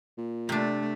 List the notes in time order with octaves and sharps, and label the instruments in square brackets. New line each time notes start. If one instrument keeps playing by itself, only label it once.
[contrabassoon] A#2
[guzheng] C3 D4 [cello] A3